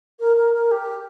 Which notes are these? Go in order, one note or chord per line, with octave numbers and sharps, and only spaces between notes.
A#4
A#4
A#4
G4